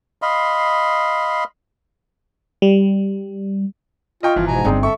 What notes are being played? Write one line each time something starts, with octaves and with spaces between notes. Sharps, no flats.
D#5 F5 B5 C6
G3
F4 D#5 G5 C#6
G1 E3 F3
G#2 B2 G#5 A#5
G1 G2 C4 D4 D#4 G#4
A4 E5 C#6